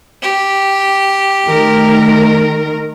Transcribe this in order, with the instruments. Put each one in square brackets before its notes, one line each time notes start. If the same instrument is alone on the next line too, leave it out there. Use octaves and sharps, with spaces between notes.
[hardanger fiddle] G4
[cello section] D#3 A3 A#4